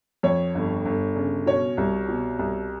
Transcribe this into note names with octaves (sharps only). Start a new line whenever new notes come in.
F2 C#5
G1
G1
C#3
B2 C#5
C2
B2
C2